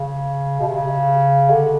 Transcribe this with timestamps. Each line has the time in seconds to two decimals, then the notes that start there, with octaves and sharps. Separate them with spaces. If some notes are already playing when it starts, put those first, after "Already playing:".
Already playing: C#3
0.60 B2
0.67 C3
0.76 C#3
1.50 D3